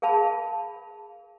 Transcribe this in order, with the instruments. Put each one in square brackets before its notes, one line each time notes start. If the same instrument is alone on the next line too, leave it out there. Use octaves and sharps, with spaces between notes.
[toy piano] G#4 A#4 F5 A5 B5